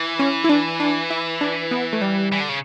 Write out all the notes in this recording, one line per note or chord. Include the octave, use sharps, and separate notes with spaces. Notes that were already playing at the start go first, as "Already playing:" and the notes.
Already playing: E3
C#4
E4
D4
D4
E4
D4
B3
A3
G3
E3
D3
C#3